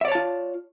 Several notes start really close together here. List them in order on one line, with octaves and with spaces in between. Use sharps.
E5 D5 C#5 A5 F4